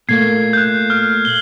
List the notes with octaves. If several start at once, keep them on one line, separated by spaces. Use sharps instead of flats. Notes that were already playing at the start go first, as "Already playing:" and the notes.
A#2 A3 A#3 G#6 C7
F#6 G6
F6
F#7 G7